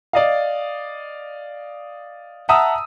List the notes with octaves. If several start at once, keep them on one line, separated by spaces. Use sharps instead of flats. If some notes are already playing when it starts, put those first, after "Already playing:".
D5 D#5 F5
E5 F#5 A5 A#5 D#6 E6